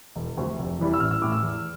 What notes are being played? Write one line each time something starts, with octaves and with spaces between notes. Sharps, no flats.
E1
D2 C3 F3
F1
E2 E3 G3
E6
A1 F6
E6
A2 E3 D6
E6
E2